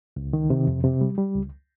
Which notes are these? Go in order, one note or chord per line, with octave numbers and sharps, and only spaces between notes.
C#2
D#3
C3
F2
C3
G3
G3
C#2